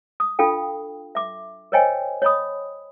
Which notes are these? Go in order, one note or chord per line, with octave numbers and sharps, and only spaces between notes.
D#6
D4 F4 A4 F5 G5
E5 D6
A#4 C5 C#5 D#5 G5 G#5
C#5 D#5 B5 D#6